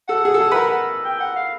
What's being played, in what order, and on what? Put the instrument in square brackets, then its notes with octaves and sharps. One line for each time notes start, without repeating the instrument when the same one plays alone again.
[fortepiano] A4 [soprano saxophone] F#5
[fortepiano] G#4
A4
G#4
B4
A#4
[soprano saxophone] G5
F#5
F5